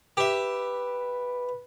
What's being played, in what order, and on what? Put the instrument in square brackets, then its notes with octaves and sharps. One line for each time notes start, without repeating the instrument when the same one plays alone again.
[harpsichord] G4 E5 [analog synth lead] B4